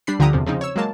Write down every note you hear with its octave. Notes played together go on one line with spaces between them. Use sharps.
G3 D4 B5 C7
D2 D3 F3 G4 A#5 D#6
E2 C3 F3
C#3 F3 C4 D#4
C#5 E6
F#3 G#3 A#3 A5